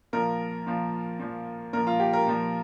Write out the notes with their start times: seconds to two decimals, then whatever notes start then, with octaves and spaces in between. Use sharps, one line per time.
0.13 A#2 F3 A#4
0.67 A#2 F3
1.20 A#2 F3
1.73 A#2 A#4
1.76 F3
1.87 F4
2.00 G4
2.13 A#4
2.26 A#2 F3